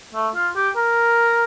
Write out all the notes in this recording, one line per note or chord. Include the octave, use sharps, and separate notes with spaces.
A3
F4
G4
A#4